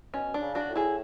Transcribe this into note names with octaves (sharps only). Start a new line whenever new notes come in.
B2 C#4
D4
C#3
D4 F#4
A2
E4 G#4